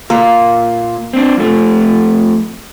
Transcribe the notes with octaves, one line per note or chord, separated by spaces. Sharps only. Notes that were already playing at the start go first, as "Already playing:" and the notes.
A#2 A#3
C4 D4
F2 A3